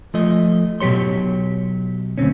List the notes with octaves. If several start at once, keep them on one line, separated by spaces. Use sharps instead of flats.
F3 A3 D#5
B2 F#3 G4 C#5 C6
D2 G#2 C4 C#4